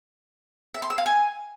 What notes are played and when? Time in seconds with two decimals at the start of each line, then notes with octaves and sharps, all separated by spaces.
0.74 E5
0.82 C6
0.90 E6
0.98 F5
1.06 G#5